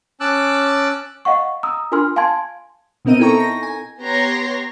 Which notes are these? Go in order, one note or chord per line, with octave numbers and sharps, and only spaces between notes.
C#4 A5 D6 E6 F#6
D#5 F5 F#5 C#6
A#5 D#6 E6
D4 F4 A#4 G#5 C6 F6
F5 G#5 A5 C6 G#6
B2 B3 C4 A#4 D#5 D#7
D#4 E4 A4 G5 A#5 C#6
A#6
G#5
B3 G4 C#5 A#5 C6 A#6